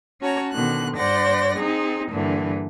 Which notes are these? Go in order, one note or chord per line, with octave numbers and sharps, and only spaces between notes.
C#4 F#4 C#5 A5 A#5
B2 D3 D#3 F#6
G2 C5 D5 F#5 A#6
C4 D#4 G#4
G2 A#2 D3 E3